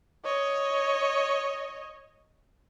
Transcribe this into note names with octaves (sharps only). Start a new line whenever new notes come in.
C#5 D#5